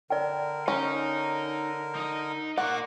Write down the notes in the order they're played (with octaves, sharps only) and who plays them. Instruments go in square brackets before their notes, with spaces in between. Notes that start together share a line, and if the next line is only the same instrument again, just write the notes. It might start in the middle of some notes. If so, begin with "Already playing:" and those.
[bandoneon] D3 A#4 [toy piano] D5 G5
[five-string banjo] C#4 [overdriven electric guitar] D#4
[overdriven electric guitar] D#4 D#5
[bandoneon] A#3 C#6 D6 [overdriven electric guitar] A#4 D5 [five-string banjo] F#5